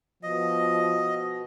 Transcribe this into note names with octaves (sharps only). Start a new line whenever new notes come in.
B2 F3 D#5